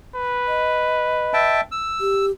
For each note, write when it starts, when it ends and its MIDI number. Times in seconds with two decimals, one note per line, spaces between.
0.16 1.65 71
0.48 1.60 75
1.33 1.61 76
1.33 1.61 79
1.33 1.61 81
1.72 2.26 88
2.01 2.31 67